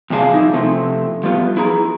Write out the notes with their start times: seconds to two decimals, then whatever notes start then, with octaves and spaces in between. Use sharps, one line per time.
0.10 F2 C3 D4 G#4 F5 A5
0.32 F3 D#4 E4
0.54 C3 F3 A3 C4
1.23 F3 G3 A3 B3 F4
1.57 E4 G#4 A#5